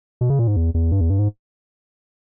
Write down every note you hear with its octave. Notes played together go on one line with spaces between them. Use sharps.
B2
C#3
A#2
G#2
E2
E2
G2
E2
G2
G#2